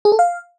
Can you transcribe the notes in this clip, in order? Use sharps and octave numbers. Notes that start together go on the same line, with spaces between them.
G#4
A4
F5